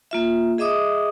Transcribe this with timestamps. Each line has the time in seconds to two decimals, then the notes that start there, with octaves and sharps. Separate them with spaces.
0.11 A#3 F4 E5
0.58 G#4 D#5 E5 D6 D#6